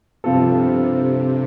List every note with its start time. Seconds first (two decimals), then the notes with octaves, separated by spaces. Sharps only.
0.24 G2 C3 F3 C4 F4 A4
0.77 C3